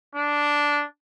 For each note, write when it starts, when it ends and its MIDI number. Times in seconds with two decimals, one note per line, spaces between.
0.15 0.84 62